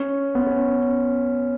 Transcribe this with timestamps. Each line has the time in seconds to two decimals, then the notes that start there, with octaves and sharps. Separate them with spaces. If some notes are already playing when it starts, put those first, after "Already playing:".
Already playing: C#4
0.35 B3
0.46 C#4